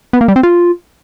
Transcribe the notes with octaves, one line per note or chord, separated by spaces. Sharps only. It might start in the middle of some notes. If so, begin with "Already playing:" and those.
B3
A#3
G3
C4
F4